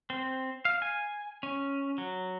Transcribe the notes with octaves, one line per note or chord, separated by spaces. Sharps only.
C4
F5
G#5
C#4
F#3